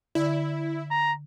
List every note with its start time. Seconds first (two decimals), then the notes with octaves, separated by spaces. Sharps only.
0.15 D3 E4 D5
0.91 A#5